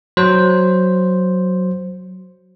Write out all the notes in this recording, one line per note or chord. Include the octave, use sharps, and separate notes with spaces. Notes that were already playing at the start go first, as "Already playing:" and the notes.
F#3 C5